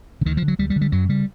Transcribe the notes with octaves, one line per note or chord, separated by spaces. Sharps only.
D3
D2 D#3
F3
D3
F#3
D2 G3
G3
D3
G3
F#2 F#3
C#3 G3